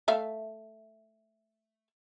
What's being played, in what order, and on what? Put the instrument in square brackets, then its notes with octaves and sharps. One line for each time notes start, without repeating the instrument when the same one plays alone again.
[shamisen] A3 E5 F5